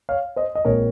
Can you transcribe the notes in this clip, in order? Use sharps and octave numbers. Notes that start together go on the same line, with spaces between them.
C#5 F5
C5 D#5
D#5
A#1 A#2 G#3 C4 A#4 C#5